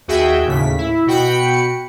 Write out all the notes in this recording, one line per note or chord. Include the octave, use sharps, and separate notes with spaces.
D#2 F#4 G#4 E5 G5
D#2 A2 C#3 B6
E4
B2 F#4 G5 B5 C#7